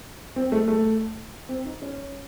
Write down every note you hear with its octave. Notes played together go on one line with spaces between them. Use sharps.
C4
A3
A3
C4
D#4
C#4